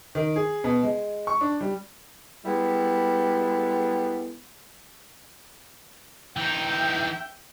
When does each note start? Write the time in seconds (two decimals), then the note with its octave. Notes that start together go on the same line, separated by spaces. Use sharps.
0.15 D#3
0.36 G#4
0.64 B2
0.83 G#3
1.27 C#6
1.41 D4
1.61 G3
2.45 G3 G#3 B3 E4 G#4 A4
6.37 E3 D#4 E5 G5 G6